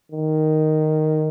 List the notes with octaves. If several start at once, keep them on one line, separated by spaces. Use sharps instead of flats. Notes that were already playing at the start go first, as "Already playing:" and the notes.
D#3